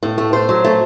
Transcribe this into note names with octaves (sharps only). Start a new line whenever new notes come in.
A2
A3
A3 C5
F#3
A3